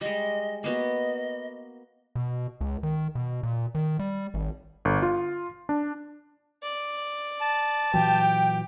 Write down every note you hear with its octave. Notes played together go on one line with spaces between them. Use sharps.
G3 G#3 D#5
A#3 B3 F#4 D#5
B2
C#2
D#3
B2
A#2
D#3
G3
G#1
G1
F4
D4
D5
A5
A#2 E3 F#3 G4 G5